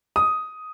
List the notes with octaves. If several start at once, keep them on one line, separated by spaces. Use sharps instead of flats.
D#6